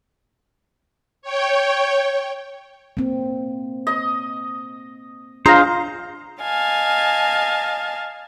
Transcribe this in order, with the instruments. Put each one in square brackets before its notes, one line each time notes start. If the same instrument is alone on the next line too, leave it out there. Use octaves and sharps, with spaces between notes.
[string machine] C#5 G5
[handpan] A#3 C4
[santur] D#5
[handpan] D4 F4 G#4 [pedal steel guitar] C5 [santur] D#5 F5 [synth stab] A#5
[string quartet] D#5 F5 G#5 A5